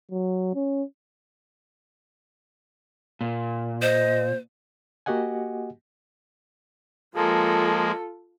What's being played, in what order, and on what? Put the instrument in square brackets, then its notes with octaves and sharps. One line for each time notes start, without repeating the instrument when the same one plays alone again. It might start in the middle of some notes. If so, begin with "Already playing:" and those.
[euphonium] F#3
C#4
[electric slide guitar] A#2
[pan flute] C5 [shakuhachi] D#5
[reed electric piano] A#3 F#4 G4 D#5 F#5 G#5
[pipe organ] F3 G#3 A#3 [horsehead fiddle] F4 A4